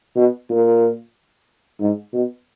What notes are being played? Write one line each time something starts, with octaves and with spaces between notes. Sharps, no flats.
B2
A#2
G#2
B2